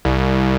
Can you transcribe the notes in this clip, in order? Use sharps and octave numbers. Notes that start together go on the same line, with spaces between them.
C2